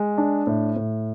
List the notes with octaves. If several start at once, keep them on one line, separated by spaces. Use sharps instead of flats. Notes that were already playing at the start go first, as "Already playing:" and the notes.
Already playing: G#3
D4
A2
A2